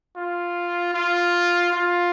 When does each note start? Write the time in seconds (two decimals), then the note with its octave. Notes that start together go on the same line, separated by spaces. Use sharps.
0.16 F4
0.94 F4
1.73 F4